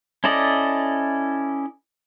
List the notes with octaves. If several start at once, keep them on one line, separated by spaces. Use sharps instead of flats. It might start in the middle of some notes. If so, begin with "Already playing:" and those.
C#4 E4 A4 D5 D#5